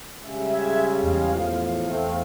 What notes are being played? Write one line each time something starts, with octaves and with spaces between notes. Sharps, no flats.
C#3 G3 G#3 E5
E5 G#6
E2 F5
A2 F3
A3 C4